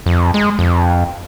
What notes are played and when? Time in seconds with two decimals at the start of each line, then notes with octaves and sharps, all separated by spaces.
0.06 F2
0.34 G#3
0.59 F2